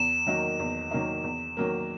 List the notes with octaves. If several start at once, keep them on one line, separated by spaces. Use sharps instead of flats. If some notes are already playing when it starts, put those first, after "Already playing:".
Already playing: E2 E7
D#3 F#3 A#3 D#4
E2
D#3 F#3 A#3 D#4
E2
D#3 F#3 A#3